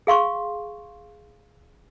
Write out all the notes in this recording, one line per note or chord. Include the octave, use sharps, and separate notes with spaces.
G#4 F5 C6 C#6